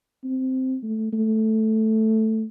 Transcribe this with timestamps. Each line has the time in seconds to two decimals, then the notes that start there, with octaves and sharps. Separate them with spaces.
0.24 C4
0.83 A3
1.13 A3